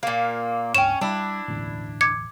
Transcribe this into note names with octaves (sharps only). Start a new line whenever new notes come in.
A#2 A#3
C#2 G2 C#4 G5 E7
G3 D4 E4
E1 A1 D2
D6 G#6 C#7